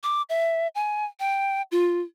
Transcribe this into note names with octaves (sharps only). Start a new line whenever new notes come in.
D6
E5
G#5
G5
F4